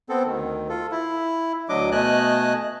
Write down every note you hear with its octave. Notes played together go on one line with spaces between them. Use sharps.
B3 C4 A4
D2 D#3
F4 A4
E4
D2 F#3 D4 D#5 D6
B2 A3 D#5 G#5 A5 F#6